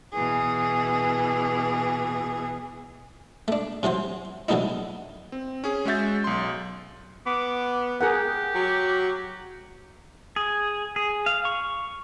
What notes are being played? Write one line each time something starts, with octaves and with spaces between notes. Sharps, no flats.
B2 E3 G#4
A3 D4
C3 E3 F#3 C5
D3 E3 F#3 A3 D#4 E4
C4
C#4 G#4
G#3 C#4 F#4 E5 G6 A6
B1 C6
B3 D6
G4 G#4 A#4 F#5
F#3
G#4
G#4
F5
C#6